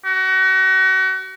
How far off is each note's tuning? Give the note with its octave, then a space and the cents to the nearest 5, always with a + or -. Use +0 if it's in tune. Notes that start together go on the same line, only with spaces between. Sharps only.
F#4 +35